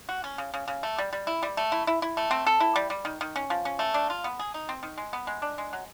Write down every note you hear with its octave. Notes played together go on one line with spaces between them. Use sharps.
F#4
C#4
C#3
C#3
C#3
A3
G3
G3
E4
G3
A3
E4
E4
E4
A3
C4
A4
E4
G3
G3
D#3
D#3
C#4
F3
C#4
A3
D4
F4
B3
G#4
D#4
C4
D#3
G#3
B3
G#3
D4
G#3
F#3